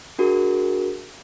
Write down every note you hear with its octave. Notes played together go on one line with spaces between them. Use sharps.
D4 F#4 G#4 A#4